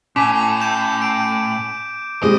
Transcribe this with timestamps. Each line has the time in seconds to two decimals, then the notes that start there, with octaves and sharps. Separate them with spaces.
0.16 A2 C#4 G#5 D6 B6
0.61 G6 E7
1.02 D7
2.22 G3 G#3 C4 C#5 D#5